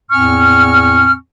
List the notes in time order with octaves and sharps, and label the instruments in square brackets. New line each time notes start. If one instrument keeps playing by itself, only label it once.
[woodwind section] E2 A2 C4 G#5 C#6 F6